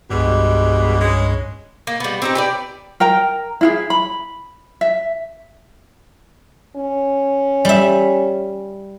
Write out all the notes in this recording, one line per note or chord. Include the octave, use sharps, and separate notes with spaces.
C2 G2 B2 G3 G#3
G#3 C#4
A#3
G3 B3
C4 D#4 G4
G4 B4 D5
A#4 G5 A#5
E4 F4 G#4
B5
E5
C#4
G3 E5